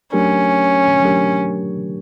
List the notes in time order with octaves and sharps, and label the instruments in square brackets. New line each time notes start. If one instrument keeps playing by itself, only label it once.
[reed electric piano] F#3 A3 D4 G4 A#4 [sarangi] C#4
[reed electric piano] F#3 A3 D4 G4 A#4